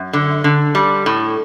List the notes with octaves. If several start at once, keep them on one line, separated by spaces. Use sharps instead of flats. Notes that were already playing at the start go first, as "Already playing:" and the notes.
Already playing: F#2
D3
D3
G3
A2